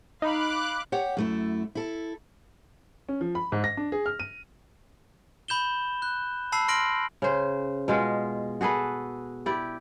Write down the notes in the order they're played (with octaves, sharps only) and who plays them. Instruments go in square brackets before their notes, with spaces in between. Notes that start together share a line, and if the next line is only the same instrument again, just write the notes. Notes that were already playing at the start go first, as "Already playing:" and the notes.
[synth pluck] D#4 [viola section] F5 B5 [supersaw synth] D6 F#6
[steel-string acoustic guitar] G4 C#5 F#5
F#2 A3 E4
E4 A4
[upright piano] C#4
F3
B5
G#2
A#6
D4
G#4
F6
D#7
[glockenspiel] B5 G6 E7 G7
F#6
A5 B5 E6 C7
C6 F6 A#6 D7 F#7
[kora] C#3 C5
B2 G#3 F4
F#4 G#4 A4 B4
E4 G4 D5